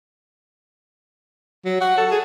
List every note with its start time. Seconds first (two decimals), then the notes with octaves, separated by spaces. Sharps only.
1.65 F#3
1.81 F#4
1.98 A4
2.11 G#4